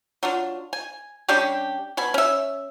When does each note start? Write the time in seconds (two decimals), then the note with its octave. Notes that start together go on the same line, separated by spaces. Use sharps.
0.23 F#3 D4 F4
0.73 G#5
1.28 G3 C#4 D4 G4
1.97 B2 G#5 B5
2.14 C#4 E5